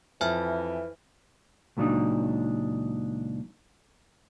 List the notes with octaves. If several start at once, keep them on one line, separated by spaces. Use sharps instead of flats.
F2 E3 E5 G#5 F6
C#2 A#2 F#3 D4 D#4